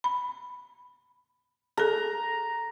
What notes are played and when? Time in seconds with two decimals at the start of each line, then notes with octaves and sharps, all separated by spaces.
0.04 B5
1.77 G#4 A4 A#5